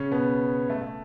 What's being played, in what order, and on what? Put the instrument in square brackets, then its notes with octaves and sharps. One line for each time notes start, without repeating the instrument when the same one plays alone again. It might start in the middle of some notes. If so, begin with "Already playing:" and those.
Already playing: [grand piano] C#3 C#4
B2 B3
A3
A3